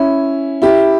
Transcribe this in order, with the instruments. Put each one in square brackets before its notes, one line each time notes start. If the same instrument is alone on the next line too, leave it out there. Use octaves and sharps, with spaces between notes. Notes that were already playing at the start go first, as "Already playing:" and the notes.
Already playing: [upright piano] C#4 E4
E4 G4